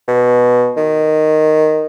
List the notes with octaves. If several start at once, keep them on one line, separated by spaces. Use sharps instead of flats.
B2
D#3